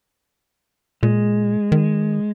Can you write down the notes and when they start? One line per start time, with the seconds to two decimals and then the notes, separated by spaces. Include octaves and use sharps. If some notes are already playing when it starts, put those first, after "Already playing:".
1.03 A#2 G#3
1.72 D#3